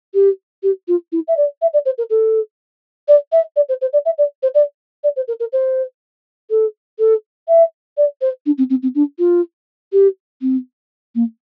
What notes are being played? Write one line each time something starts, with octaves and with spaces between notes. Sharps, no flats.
G4
G4
F4
E4
E5
D5
E5
D5
C5
A#4
A4
D5
E5
D5
C5
C5
D5
E5
D5
C5
D5
D5
C5
A#4
A#4
C5
A4
A4
E5
D5
C5
D4
C4
C4
C4
D4
F4
G4
C4
A#3